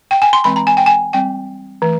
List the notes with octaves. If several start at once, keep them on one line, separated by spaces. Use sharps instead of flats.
G5
G#5
C6
E3 G#3 C4 B5
A#5
G#5
G5
G#5
G3 C4 G5
E3 A3